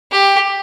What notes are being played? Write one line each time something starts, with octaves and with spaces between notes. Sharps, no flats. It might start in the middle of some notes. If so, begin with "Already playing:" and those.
G4